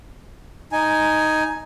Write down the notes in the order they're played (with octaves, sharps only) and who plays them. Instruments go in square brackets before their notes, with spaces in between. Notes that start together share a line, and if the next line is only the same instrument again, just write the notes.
[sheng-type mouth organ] D#4 G#5